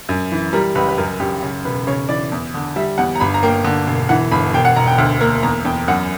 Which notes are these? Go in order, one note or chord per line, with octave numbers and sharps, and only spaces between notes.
F#2
E3
G3 A#4
C#2 B4
B4
F#2 A#4
F#2 G4
C#3
E1 B4
C#3 C#5
E3 D5
E2
D3
G3 E5
E2 F#5
A#5
G1 B5
A#5
A#3 G5
D3
E1
E3 F#5
G1 B5
E1 G5
F#5
E1 A#5
G5
D2
A#3
E2 A#5
E2 G5
F#2 F#5